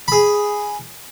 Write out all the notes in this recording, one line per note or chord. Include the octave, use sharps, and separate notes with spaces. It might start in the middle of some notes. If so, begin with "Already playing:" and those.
G#4 B5